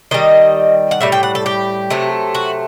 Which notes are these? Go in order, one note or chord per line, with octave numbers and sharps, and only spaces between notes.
D#3 G3 D#5
F#5
A2 G3 E5
G5
F#5
A4
G4
C3 F#3 A3
F#4